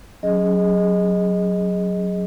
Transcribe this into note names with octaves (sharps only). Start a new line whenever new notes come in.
F#3 C#4 G#4 D#5